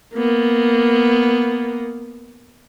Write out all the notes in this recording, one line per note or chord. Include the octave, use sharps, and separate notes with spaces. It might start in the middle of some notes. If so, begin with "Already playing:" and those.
A#3 B3